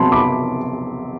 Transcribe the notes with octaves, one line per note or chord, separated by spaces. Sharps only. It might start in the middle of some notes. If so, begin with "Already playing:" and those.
Already playing: C3 F#3 B3 A5 B5 C6
B5 D6